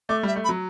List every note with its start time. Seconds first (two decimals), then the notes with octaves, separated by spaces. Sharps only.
0.09 A3 D6
0.23 G3 E5
0.36 A3
0.44 B5
0.49 F#3